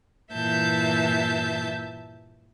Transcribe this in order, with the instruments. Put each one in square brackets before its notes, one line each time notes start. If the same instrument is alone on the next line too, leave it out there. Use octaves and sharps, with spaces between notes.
[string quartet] G2 A#2 E3 E5 A5 G6